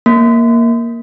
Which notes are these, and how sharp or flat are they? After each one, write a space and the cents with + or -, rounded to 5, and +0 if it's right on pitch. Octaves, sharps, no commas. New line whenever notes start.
A#3 +0